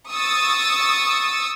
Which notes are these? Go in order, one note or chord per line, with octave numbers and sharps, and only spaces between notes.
C#6 D#6 E6 A6